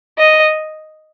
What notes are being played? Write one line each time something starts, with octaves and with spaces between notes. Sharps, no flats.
D#5